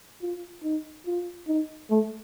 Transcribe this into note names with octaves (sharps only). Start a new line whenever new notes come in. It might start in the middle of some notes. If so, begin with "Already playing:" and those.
F4
D#4
F4
D#4
A3